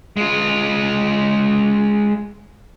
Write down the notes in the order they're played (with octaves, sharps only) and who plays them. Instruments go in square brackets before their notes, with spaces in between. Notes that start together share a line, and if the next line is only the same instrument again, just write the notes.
[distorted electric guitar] G#3 F4